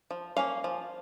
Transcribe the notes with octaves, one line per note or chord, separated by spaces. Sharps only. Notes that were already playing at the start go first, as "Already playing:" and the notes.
F3
A#3 C#4 F5
F3